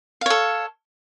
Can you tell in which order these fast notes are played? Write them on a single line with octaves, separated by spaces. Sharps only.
F5 C#5 A4